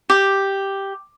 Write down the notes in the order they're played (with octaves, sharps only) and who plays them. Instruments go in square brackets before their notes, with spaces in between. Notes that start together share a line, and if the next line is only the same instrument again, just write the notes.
[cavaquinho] G4